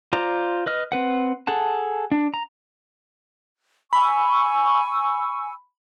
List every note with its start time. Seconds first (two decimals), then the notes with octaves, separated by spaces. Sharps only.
0.13 F4 C5 D5 A#5
0.66 B4 D#5 F6
0.92 C4 B4 F#5
1.47 G#4 A4 F#5 A5
2.12 D4
2.34 A#5
3.93 G#5 B5 C#6 E6